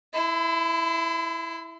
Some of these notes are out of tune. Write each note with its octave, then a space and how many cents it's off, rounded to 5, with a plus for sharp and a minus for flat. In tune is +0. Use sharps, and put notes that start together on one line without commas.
E4 +0 B5 +45